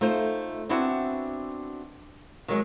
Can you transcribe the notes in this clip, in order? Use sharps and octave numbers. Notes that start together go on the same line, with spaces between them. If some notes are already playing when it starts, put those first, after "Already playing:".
A3 D#4 F4 C5
B3 C4 D4 E4 F#4 F#5
D#3 F#3 G#3